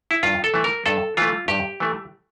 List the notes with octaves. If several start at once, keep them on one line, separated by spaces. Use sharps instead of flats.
E4
G2 F4
A4
E3 A3
A#4
G2 A4
E3 A3 F4
G2 G4
E3 A3